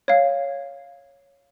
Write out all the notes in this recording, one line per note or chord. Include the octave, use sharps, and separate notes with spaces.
C#5 F5